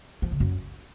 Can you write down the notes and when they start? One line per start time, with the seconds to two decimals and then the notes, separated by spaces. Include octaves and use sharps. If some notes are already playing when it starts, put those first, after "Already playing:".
0.22 F3
0.31 C#3
0.40 F#2